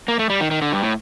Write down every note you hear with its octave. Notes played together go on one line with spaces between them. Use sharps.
A#3
A3
G3
D#3
D#3
D3
G2
A2